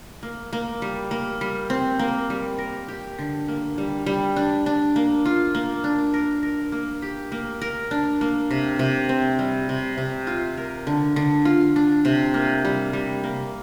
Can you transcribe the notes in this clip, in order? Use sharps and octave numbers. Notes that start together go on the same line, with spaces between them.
A#3
A#3
G3
A#3
G3
C4
A#3
G3
A#4
G4
D3
A#3
G3
G3
D4
D4
A#3
F4
A#3
D4
A#4
A#4
A#3
G4
A#3
A#4
D4
A#3
C3
C3
C4
G3
C3
C3
F4
A#4
D3
D3
F4
D4
C3
A#3
G3
G3
A#3